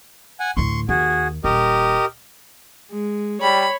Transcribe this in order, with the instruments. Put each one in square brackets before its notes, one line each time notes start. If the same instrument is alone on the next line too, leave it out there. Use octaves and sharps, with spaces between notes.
[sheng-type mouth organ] F#5 G#5
[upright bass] D2 A2 [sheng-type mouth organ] C6 C#6
[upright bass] D#2 [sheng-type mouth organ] F#4 G#4
[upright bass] D#1 [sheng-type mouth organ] G4 A#4 D#5
[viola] G#3
[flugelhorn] G3 [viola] C#5 [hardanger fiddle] B5